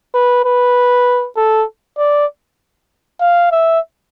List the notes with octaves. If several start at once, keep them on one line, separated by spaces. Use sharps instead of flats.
B4
B4
A4
D5
F5
E5